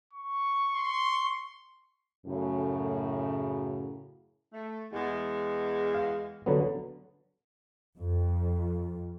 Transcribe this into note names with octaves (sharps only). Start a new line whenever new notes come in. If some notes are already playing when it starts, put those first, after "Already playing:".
C#6
C6
F#2 A2 C#3
A3
E2 G#3
F5
D3 F#3 B3
F2